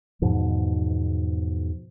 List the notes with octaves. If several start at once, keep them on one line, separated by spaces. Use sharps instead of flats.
E2 G#2 B2 F3